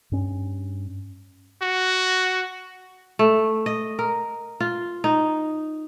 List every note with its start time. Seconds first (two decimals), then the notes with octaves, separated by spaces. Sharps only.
0.12 G2 C#4
1.62 F#4
3.19 A3
3.66 D#5
3.99 A#4
4.60 F4
5.04 D#4